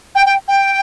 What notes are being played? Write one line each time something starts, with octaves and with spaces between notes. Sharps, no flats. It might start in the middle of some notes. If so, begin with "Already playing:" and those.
G5
G5
G5